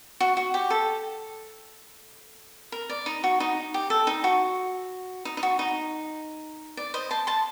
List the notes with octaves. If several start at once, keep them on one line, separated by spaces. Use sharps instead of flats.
F#4
F#4
G4
A4
A#4
D5
D#4
F#4
D#4
G4
A4
D#4
F#4
D#4
D#4
F#4
D#4
D5
C5 D#5
A5 C6
A5 C6